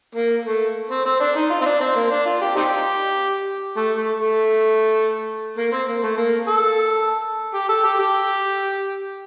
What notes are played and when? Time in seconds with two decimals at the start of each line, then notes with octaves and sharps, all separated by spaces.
0.15 A#3
0.45 A3
0.90 C4
1.05 C4
1.20 D4
1.35 D#4
1.50 F4
1.61 C4
1.65 D4
1.80 C4
1.95 A#3
2.11 D4
2.26 F4
2.41 G4
2.56 C4 D#4 G4
3.76 A3
3.97 A3
4.17 A3
5.58 A#3
5.72 C4
5.88 A#3
6.03 A3
6.17 A#3
6.48 A4
7.53 G4
7.69 A4
7.83 G4
7.99 G4